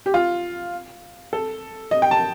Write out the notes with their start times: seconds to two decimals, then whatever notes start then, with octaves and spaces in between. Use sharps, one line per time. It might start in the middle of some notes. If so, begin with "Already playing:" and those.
0.06 G4
0.14 F4
1.33 A4
1.91 D#5
2.02 G5
2.11 A5